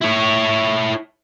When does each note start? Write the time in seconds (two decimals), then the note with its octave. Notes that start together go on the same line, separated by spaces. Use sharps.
0.02 E4 C#5